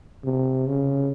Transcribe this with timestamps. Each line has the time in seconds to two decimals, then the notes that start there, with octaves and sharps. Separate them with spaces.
0.25 C3
0.67 C#3